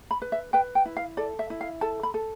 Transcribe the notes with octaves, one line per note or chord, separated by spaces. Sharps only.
B5
B4
E5
B4 G5
G5
E4
F5
A4 D5
E5
E4
F5
A4 A5
B5
A4